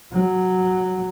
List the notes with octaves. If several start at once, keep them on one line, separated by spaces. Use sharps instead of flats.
F#3